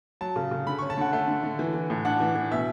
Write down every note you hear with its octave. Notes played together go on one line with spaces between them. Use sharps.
F#3 A5
C#3
C#3
D3 B5
C#6
C#4
A5
D3 F#5
A3
D3
D3
E3
E3
A2
D4 F#5
E3
E3
B2 E5